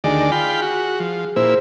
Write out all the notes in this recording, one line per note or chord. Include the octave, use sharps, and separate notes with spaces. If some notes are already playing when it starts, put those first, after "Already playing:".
D2 D#3 G#4 D5
F4 G5 B5
F#4
F3
A#2 E4 C5